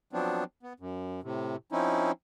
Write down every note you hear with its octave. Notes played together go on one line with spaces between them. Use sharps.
F3 F#3 B3 C4 D4
B3
F#2
A2 C3
F3 C4 C#4 D#4 E4